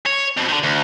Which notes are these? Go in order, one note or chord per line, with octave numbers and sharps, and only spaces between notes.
C#5
F2 B2
D3 D#3
D2